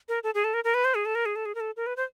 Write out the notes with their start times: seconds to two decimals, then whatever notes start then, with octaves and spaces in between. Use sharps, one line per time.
0.09 A#4
0.23 A4
0.34 G#4
0.44 A4
0.54 A#4
0.64 A#4
0.74 B4
0.85 C5
0.95 G#4
1.05 A4
1.15 A#4
1.26 G#4
1.36 A4
1.46 G#4
1.55 A#4
1.60 A4
1.77 A#4
1.86 B4
1.97 C5